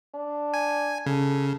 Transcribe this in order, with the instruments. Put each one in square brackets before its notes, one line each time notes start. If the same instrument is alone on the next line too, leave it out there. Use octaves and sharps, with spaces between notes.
[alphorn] D4
[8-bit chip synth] G#5
[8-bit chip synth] C#3 [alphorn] A4